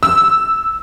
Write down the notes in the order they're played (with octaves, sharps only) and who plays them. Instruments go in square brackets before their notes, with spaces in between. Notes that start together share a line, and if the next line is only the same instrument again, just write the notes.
[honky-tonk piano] E6